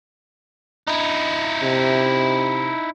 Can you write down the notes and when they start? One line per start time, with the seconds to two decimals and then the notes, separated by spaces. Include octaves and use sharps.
0.87 D#4 E4
1.63 C3